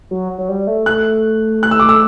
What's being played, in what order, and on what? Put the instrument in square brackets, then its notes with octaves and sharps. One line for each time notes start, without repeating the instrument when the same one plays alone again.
[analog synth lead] F#3
F#3
G3
A3
[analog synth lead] A3 [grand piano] F#6
[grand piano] F#6
E6
D6
E6